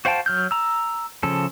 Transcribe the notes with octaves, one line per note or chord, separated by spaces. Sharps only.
F#4 C5 F5 G5 A5
F#3 F6 G6
A#5 E6
C#3 F3 A4